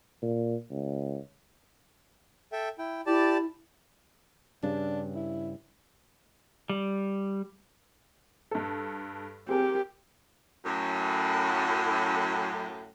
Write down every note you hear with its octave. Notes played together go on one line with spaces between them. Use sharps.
A#2
C#2
A4 E5 G5
E4 G5
E4 G4 D5 A5
G2 C#3 D4
E4
G3
G2 A4
C4 G4 G#4 A#4
F#2 A2